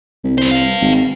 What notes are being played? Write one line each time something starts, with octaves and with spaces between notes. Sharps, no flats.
C2
C2 B3 C5
B4 F5
G#1